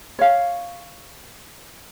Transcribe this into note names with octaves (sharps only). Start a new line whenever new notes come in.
C#5 F5